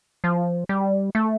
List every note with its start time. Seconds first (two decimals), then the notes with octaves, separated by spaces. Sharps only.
0.24 F3
0.69 G3
1.15 A3